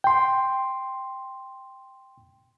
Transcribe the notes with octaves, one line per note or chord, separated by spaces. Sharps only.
G5 C6